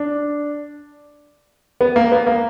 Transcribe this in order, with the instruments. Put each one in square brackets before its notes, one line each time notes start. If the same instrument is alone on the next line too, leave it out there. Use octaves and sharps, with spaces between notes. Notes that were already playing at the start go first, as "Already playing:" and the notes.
Already playing: [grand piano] D4
B3
A#3
B3
A#3